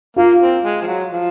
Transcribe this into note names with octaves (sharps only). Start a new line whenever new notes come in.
A#3 F4
C4
G#3
F3
F#3
F3